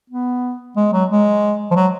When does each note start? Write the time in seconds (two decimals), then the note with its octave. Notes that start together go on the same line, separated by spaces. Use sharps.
0.10 B3
0.77 G#3
0.93 F#3
1.10 G#3
1.71 F3
1.76 F#3